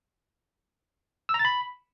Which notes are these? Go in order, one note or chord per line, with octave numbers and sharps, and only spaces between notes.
E6
A#5
A6
B5